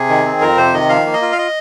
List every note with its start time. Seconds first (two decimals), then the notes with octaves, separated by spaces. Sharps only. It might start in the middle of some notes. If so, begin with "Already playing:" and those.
Already playing: C3 G#4
0.09 D#3
0.26 C4
0.41 F2 A#4
0.58 C3 C5
0.74 D#3 D#5
0.89 F3 F5
1.06 A#3
1.13 D#5
1.22 F4
1.32 F5
1.38 D#5